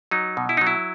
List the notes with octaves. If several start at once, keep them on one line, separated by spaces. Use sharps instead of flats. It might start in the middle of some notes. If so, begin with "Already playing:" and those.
F#3 D#4
B2
E4
D#4
F#3
E4